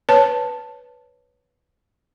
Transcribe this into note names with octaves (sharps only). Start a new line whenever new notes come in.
B4 C#5 A5